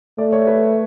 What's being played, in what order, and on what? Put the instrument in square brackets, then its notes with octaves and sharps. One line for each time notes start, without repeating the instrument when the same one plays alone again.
[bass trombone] A3 [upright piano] D5
[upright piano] C#5
B4